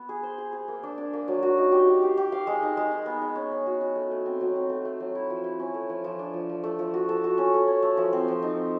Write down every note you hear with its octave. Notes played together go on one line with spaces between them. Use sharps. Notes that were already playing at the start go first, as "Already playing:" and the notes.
Already playing: B3
G#4
C5
G#4
G#4
A#3
D4
D4
A#3
F#3
F#4
D#4
G4
F5
G4
G4
F5
G#3
D#4
G#3
D#4
B3
G#3
C#4
C#4
F#4
C#4
A3
A3
C4
F#3
C4
A3
A3
F#3
E4
F3
E4
C#4
A3
F3
F3
D4
F3
F3
A3
F3
F#4
A4
F#4
C#4
A4
C#5
A3
F3
C4
F3
D#4
C4